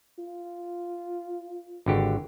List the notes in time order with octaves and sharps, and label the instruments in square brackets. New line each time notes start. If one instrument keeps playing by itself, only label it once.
[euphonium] F4
[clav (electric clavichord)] G#1 D3 G4